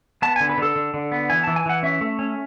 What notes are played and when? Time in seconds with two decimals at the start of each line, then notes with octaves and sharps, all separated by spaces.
0.22 B3 A5
0.36 G#5
0.40 D3
0.50 B4
0.58 D3 A4
0.76 D3
0.94 D3
1.12 B3
1.30 E3 G#5
1.44 E3 A5
1.56 G#5
1.66 E3 F#5
1.83 C#4 E5
2.01 A3
2.19 C#4